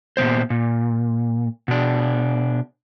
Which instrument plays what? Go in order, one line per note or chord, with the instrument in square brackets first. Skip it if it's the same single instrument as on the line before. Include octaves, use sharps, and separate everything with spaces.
[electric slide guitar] A#2 D#3 B3 C5
A#2
B2 D4